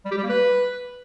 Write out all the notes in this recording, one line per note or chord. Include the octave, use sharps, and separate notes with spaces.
G3
G4
G3
A#3
B4